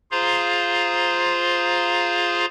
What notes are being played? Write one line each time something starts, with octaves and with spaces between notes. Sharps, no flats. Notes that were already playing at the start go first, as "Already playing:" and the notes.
F4 G#4 C5 F5 A#5 C6